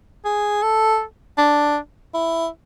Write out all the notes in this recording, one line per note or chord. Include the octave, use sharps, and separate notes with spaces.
G#4
A4
D4
E4